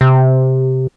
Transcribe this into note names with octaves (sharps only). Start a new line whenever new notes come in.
C3